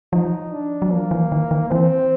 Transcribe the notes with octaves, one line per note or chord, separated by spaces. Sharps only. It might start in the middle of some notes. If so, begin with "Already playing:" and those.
F3 D#4
D4
F#3
F3 A#3
E3
D#3
D#3
E3 C4